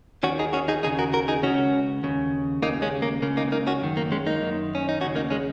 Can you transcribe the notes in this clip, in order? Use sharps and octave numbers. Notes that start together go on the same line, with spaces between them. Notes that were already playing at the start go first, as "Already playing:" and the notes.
D#2 D#3 C#4 F#4
D#4 G#4
C#4 F#4
D#4 G#4
D#2 C#3 D#4 G#4
F#4 A#4
F#4 A#4
D#4 G#4
C#2 C#3 C#4 F#4
D#2 C#3
D#2 C#3 A#3 D#4
G#3 C#4
A#3
C#2 C#3 A#3
A#3 D#4
A#3 D#4
C#4 F#4
F#2 D#3
A#3
G#3 C#4
A#3 D#4
F#2 D#3
C#4
D#4
D#2 C#3 C#4 F#4
A#3 D#4
G#3 C#4